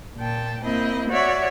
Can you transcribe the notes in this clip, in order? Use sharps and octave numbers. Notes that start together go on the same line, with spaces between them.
A#2 G5 A5
A#3 C4 E4 D#5
F#4 C#5 D5 E5